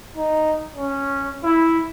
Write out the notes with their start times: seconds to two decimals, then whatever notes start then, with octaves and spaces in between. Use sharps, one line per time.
0.16 D#4
0.76 C#4
1.44 E4